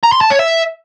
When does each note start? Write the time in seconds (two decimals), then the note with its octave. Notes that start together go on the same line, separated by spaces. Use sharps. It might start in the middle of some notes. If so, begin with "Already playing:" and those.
0.03 A#5
0.12 C6
0.21 A5
0.30 C#5
0.39 E5